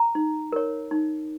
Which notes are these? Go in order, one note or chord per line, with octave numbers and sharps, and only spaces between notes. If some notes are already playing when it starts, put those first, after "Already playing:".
Already playing: A#5
D#4
A#4 C#5
D#4